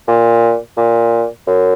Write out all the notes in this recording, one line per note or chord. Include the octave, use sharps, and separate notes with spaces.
A#2
A#2
F#2